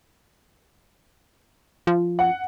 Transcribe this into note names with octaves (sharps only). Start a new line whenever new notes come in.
F3
F#5